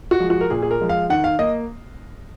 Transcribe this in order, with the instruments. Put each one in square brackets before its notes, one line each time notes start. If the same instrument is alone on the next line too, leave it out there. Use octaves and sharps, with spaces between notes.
[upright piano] F#4
F3 G#3
F#4
A#4
A#2 G#4
G#4
A#4
F3 G#3
F5
D#3 F#5
F5
A#3 D#5